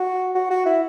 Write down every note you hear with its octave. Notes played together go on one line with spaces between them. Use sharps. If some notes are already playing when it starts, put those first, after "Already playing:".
Already playing: F#4
F#4
F#4
E4